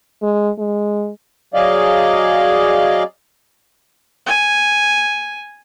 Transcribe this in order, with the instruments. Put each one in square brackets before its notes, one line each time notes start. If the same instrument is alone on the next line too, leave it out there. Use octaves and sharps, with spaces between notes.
[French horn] G#3
G#3
[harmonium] F#3 G#4 D5 D#5 F5
[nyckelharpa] G#5